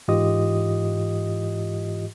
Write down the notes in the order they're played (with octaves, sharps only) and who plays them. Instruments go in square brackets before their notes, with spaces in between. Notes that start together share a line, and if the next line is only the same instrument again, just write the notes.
[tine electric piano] G#2 E3 F4 G4 D#5 D#6